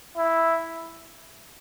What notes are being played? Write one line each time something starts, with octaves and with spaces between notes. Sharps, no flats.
E4